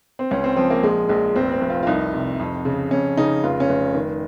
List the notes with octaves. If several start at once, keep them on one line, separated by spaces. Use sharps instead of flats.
C4
C#2 C#4
C4
F3 C4
A#3
A#1 G#3
A#1 G#3
F1 C4
C4
F1
F4
F4
C2 D#4
C3
F2
C#3
F2 C#4
C#3 D#4
F1 F4
C#4
F1
D#3